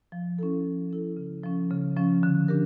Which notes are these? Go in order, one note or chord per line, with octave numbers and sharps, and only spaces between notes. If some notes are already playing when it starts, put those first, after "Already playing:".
F3
C#4 E4 A4
F3
C#4 E4 A4
C#3
F3 C#4
C#3
F3 C#4
D3
D4 G4 A#4